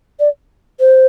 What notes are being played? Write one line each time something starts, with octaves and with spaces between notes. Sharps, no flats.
D5
C5